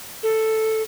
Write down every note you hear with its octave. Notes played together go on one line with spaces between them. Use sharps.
A4